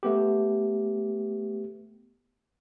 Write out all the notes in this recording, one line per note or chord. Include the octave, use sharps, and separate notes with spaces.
A3 B3 G4